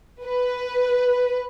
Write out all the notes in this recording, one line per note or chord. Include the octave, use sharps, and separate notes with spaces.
B4